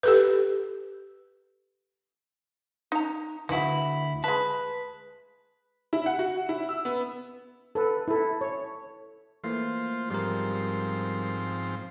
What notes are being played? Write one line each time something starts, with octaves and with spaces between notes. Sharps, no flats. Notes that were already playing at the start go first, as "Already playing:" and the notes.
G4 A4 B4
D#4 A#5
D2 E3 E4 F#4
G#3 B4 A5
E4
F#5
F#4
E4
E6
B3
A4 B4
E4 A4
C#5
E3 A3 A#3 F4 C5
G#2 F3 G3 C4 A#4